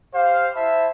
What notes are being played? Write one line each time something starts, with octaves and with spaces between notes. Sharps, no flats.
G4 C5 F5
E4 C5 E5 A5 B5